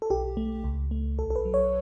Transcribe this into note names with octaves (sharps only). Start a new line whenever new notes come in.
A4
B1 G4
A3
C#2
A3
B1 A4
A4
B4
F#3
C#5